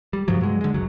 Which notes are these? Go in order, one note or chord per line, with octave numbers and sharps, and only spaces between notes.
G3
G2 C3 F3 F#3
G2 F#3 G#3
D3 G#3
F#1 C#2 F#3